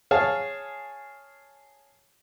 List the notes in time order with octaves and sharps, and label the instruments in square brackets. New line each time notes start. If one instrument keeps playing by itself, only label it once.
[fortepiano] G#4 C#5 F5 A5